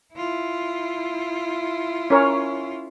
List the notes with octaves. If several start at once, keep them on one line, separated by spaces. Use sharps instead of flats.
E4 F4
C#4 A#4 C#5